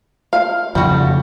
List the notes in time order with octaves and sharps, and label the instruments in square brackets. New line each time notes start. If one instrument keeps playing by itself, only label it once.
[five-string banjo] F5
[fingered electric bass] F2 C#3 [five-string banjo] G3 F#4